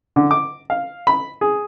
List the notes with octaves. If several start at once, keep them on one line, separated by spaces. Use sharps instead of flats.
D3
D6
F5
B5
G#4